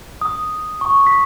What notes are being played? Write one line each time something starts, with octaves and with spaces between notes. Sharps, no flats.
D#6
C#6
B6